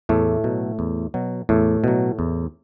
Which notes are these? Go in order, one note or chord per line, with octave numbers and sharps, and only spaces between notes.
E2 A2 A3
B2 F#3
E2
B2 F#3
E2 A2 A3
B2 F#3
E2